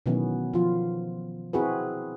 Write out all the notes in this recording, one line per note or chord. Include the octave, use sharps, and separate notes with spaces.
B2 D#3 E3 F#3 B3 C#4
F3 F4
C4 E4 F#4 G#4 B4